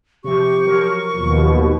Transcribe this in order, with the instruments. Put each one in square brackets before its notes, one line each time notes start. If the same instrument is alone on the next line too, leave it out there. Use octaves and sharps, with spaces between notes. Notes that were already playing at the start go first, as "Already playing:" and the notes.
[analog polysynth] C3 F3 [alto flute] G4 [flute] C#6
[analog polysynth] F3 F#3 A#4
[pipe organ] D#2 B2 [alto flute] F4